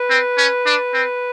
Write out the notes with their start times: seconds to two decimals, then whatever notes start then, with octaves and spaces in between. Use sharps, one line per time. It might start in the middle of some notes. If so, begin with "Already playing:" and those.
Already playing: B4
0.10 C4
0.38 C#4
0.66 D4
0.94 C4